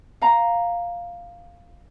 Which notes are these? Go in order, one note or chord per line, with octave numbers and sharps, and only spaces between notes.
F5 A#5